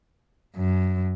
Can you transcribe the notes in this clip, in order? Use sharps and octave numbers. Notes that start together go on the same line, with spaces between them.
F#2